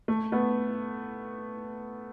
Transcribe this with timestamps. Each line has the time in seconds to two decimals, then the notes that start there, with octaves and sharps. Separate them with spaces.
0.08 A3
0.32 A3 B3